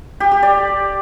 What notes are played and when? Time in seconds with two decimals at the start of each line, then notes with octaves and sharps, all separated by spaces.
0.20 G4
0.31 G4
0.43 D5